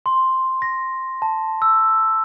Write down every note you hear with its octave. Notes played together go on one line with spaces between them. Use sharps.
C6
A#6
A5
E6